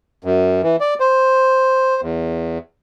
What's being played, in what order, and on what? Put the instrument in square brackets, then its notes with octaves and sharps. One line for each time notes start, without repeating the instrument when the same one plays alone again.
[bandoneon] F#2
E3
D5
C5
E2